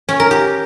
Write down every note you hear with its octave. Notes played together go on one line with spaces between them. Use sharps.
C#4
A#4
G4